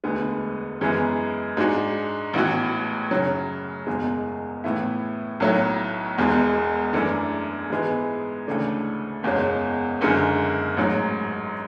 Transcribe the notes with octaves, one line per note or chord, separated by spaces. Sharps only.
E1 D2 D3 G#3 B3
F#2 E3 G#3 B3
G#2 G#3 D4 F#4
A1 A2 E3 B3 F#4
F#2 C#3 F#3
F#1 E2 B2 G#3
A2 E3 B3 E4
B1 A2 F#3 A3 E4
E1 E2 B2 G#3
F#2 E3 A3 D4
G#2 E3 G#3 B3
D2 C#3 E3 A3 D4
F#1 E2 B2 G#3 C#4
F#1 F#2 D3 G#3
A1 G#2 F#3